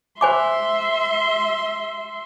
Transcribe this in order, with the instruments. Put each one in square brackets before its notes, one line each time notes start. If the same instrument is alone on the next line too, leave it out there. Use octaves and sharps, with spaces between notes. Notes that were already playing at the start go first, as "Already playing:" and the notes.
[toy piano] C5 G#5 D6 [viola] E5 C6